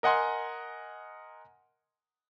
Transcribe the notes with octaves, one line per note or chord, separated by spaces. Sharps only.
A#4 D#5 F#5 G#5 C6